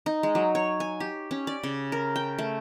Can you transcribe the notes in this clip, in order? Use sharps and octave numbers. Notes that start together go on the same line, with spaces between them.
D#4
G#3
F#3
C#5
G#5
G4
C#4
D5
C#3
A#4
G5
A3